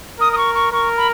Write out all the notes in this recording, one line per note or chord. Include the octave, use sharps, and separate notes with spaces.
A#4 D#6
D#6
C#6
C#6
A#4 C#6
B5